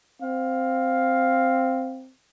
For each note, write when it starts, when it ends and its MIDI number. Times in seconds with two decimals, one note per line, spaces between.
0.22 2.11 60
0.22 1.99 77